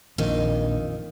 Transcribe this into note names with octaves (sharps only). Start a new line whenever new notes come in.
A#1 F2 D#3